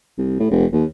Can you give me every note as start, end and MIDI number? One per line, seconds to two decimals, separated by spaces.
0.18 0.39 36
0.40 0.47 45
0.51 0.65 29
0.72 0.84 39